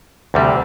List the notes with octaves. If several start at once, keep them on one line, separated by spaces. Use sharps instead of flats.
D2 C3 G3